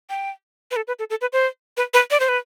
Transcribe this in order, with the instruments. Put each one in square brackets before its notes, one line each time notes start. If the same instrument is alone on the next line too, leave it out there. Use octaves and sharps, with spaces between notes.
[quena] G5
B4
A4
B4
A4
A4
B4
C5
B4
B4
D5
C5
B4